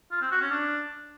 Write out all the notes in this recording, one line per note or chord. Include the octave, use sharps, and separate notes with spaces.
F4
C4
F#4
C#4
D4